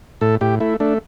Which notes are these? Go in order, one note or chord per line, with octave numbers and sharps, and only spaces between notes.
A2 A4
A2 G4
A3 E4
A3 D4